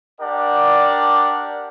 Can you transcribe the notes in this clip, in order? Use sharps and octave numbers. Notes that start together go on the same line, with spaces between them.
D4 G4 A#4 D5 F#5